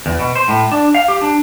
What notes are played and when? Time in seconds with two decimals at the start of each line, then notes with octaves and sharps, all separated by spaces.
0.06 E2
0.19 B2
0.35 C5
0.48 A2
0.71 D4
0.94 F5
1.08 G4
1.22 D4